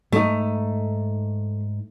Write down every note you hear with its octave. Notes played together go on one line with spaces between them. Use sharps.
G#2 A3 D#4